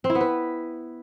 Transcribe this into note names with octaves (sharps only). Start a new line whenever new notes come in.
C4
E4
B3
B4